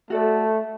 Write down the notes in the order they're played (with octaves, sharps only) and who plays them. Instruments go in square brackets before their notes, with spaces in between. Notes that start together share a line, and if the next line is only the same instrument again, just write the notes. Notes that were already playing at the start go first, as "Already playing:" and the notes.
[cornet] A3 [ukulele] F#4 A4 D5